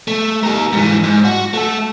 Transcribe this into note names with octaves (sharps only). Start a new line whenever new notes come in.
A3
G4 A#4
G#2 E3
G#2
F#4
A3 A4